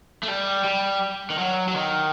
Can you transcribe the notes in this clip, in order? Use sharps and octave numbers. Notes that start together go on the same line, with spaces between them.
A3
G3
G3
D#3
F#3
F#3
D#3